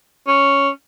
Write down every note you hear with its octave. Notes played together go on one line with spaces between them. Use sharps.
C#4